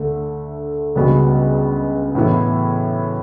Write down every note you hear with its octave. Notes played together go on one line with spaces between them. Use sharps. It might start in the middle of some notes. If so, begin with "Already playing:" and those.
Already playing: D2 D3 A3
C#2 C#3 G3 B3 F#4
A2 E3 B3 E4